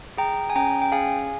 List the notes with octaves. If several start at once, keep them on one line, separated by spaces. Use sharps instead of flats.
G#4 G5 A#5
G#5
C#4 G5 A#5
G5
G#4 F5 G#5